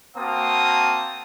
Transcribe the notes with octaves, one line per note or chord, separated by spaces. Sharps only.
A#3 C4 F#4 F5 A5 D#6